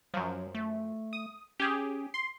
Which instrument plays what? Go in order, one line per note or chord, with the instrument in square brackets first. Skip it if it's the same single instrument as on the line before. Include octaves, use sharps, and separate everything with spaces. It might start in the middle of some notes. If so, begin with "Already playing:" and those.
[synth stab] F#2 F3 [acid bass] F#3
[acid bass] A3
[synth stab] D#6
[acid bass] C#4 [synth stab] G4 G#4
[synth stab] C6